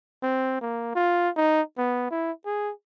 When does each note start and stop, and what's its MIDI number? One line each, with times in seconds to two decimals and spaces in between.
0.22 0.60 60
0.61 0.93 58
0.95 1.29 65
1.36 1.61 63
1.78 2.10 59
2.10 2.32 64
2.45 2.72 68